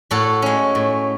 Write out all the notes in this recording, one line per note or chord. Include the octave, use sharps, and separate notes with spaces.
A2 F#4 A4
G#3 C#4
A2